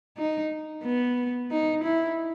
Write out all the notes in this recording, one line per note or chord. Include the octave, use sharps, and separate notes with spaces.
D#4
B3
D#4
E4